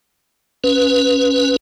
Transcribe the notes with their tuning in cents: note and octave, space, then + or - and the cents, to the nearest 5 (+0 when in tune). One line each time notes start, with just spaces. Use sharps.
C#4 +0 B4 +0